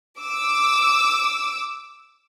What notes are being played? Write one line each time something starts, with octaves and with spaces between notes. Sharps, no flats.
D6 E6